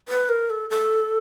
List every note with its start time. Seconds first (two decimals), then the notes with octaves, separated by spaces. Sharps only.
0.09 B4
0.29 A#4
0.50 A4
0.70 A4